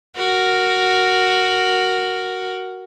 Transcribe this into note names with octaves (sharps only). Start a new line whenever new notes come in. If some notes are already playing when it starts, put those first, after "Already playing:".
F#4 A#4